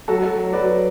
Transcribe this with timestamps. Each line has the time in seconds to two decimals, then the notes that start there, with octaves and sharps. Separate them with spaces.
0.08 F#3 F#4 A4
0.23 F#3
0.39 F#3
0.53 F#3 B4 D5